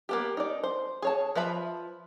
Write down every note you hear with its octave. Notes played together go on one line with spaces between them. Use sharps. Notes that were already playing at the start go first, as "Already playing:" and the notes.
A#3 B3 G4
D#4 D5
C5
G#4 C#5 A5
F3 B4 E5 B5